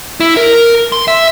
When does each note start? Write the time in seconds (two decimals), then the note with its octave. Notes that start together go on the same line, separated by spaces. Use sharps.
0.20 E4
0.37 A#4
0.92 C6
1.08 E5